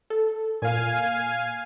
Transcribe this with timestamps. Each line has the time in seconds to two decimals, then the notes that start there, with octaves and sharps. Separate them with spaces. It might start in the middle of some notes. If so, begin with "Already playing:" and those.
0.10 A4
0.62 A#2 F5 G#5